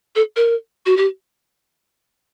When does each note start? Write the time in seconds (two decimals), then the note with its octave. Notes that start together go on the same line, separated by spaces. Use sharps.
0.15 A4
0.36 A#4
0.86 F#4
0.97 G4